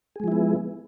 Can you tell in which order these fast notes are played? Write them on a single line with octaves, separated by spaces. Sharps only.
G#4 G#3 F3 E4 B3